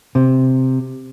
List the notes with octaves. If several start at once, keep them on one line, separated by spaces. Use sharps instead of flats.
C3